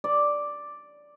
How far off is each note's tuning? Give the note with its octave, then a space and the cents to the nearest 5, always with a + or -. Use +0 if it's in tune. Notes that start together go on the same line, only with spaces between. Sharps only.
D5 +0